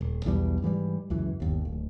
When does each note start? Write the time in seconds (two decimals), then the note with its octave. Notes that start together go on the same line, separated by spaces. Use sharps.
0.01 D#1
0.25 B1 E2 B2 G3
0.62 G#2 E3 F3 G3
1.10 C#2 F#2 E3
1.40 G1 D#2
1.65 D1